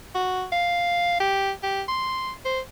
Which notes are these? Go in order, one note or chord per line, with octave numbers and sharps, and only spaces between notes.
F#4
F5
G4
G4
C6
C5